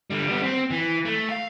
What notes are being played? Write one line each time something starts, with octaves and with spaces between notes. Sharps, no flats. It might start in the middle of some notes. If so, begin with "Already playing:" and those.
D3 G3
G3 B3
C4
E3
A3
F5